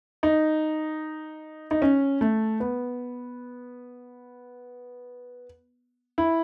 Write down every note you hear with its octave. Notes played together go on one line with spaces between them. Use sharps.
D#4
D#4
C#4
A3
B3
E4